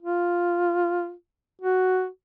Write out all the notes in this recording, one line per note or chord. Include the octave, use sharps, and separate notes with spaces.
F4
F#4